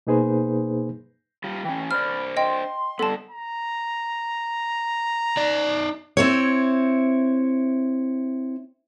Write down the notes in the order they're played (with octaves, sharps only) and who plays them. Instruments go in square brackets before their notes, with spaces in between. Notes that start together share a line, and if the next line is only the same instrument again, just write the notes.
[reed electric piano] B2 A#3 D#4 G#4 B4 C5
[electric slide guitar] G3 F4
[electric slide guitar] E3 C#4 [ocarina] G5
[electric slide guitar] D4 C5 D5 [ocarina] B5 [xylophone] F6
[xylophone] D#5 G5 [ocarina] C6
[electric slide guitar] G3 B3 [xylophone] A4 A5
[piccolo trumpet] A#5
[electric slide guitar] D#4 D5
[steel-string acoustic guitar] C4 E4 C#5